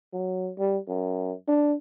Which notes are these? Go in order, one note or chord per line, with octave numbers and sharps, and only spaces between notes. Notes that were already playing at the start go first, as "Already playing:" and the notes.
F#3
G3
F#2
D4